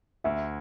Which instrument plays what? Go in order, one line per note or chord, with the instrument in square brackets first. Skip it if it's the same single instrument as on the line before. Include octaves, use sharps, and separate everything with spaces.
[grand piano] D2 [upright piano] E5